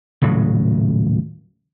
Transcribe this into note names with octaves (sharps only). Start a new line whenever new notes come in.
D#1 A2 C#3 F#3